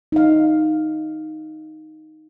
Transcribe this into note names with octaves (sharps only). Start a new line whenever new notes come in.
D#4 F5